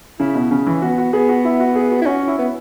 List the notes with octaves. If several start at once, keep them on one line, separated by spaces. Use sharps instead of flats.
C#3 E4
B2
C#3 C#4
E3
B3 F#4
F#4
B3 G#4
F#4
E4
F#4
G#4
F#4
E4
C#4 F#4
E4
B3